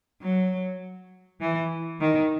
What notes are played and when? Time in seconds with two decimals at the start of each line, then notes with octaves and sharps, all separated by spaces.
0.22 F#3
1.41 E3
2.00 D#3